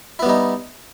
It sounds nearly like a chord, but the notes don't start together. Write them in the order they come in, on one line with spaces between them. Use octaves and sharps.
E4 B3 G3 D#4